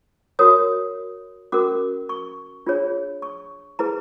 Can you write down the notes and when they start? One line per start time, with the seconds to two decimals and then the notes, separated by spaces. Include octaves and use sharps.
0.39 F#4 A#4 C#5 D#6
1.52 C#4 F#4 A#4 D6
2.09 C#6
2.66 D4 F4 G#4 C#5
3.22 C#6
3.79 E4 G#4 B4 A#5